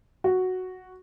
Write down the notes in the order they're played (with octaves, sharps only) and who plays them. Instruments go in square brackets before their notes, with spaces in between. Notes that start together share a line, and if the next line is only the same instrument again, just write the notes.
[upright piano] F#4